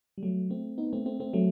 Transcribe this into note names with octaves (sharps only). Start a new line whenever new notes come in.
G3
F#3 A3
A3 C4
B3 D#4
A3 C4
A3 C4
A3 C4
F#3 A3